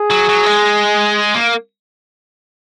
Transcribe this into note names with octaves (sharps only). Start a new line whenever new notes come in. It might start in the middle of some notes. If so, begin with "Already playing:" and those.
Already playing: G#4
F#3
F#3
G#3
A#3